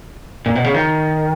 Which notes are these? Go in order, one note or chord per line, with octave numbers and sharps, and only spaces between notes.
A#2
B2
C#3
D#3